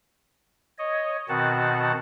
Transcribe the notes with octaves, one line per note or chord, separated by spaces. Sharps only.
C#5 D#5
B2 D#3 C4 F#4 F#5 A5